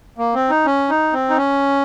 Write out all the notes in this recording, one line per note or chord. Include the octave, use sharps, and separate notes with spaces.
A#3
C4
D#4
C#4
D#4
C4
D#4
C#4